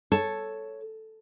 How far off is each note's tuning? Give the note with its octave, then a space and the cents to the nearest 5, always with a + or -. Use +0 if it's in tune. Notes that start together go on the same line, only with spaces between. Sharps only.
A4 +0 C#5 +0 A5 +0